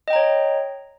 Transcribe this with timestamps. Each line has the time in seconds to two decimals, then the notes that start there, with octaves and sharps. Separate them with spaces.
0.08 D#5
0.10 G5
0.13 A#5
0.16 C#5